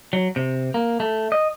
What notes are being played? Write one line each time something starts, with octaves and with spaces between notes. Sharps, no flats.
F#3
C3
A#3
A3
D#5